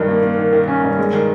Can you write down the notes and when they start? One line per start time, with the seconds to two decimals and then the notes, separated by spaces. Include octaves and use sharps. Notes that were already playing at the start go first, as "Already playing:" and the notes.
Already playing: G2 D#3
0.08 A#3
0.23 A#3
0.38 D#3
0.53 D#3
0.68 C#4
0.84 G2
0.99 G#3
1.13 D#3